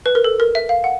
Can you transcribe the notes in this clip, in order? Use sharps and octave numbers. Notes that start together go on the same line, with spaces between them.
B4
A#4
A4
A#4
E5
F5
F#5